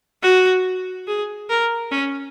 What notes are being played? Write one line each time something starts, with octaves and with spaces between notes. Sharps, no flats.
F#4
G#4
A#4
C#4